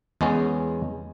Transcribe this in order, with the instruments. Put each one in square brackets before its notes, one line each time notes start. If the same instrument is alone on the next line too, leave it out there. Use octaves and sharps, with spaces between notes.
[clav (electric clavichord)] E2 G#3 B3 C#4